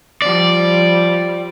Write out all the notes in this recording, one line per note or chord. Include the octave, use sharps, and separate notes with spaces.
F3 G3 D5